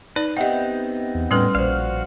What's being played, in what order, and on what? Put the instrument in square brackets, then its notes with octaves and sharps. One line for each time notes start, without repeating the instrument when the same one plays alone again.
[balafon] D#4 D5 [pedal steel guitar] B4
[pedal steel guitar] B3 C4 D#4 [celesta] G4 E5 G5 [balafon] D#5 F#5
[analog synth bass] E2
[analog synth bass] A2 [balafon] G3 C#4 B4 [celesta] C6 F6
[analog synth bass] A#1 [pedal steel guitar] F#4 F5 [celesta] C5 D5